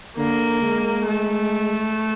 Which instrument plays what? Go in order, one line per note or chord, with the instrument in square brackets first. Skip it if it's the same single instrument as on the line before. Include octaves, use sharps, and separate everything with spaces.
[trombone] D3 [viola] A#3
[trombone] G#3
[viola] A3